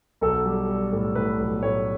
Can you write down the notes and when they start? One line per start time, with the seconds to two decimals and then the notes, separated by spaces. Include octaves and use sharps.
0.21 B1 A4
0.46 G3
0.68 G3
0.93 A2
1.15 A2 B4
1.40 B1
1.63 A2 C#5